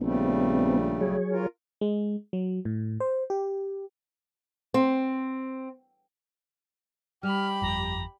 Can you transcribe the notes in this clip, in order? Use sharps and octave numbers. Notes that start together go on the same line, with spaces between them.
A#1 C#3 G3 A3 B3 C4
F#3 G#4 C#5
F4 A#4
G#3
F#3
A2
C5
G4
C4
G3 G4 B5 F6
G1 F2 A#5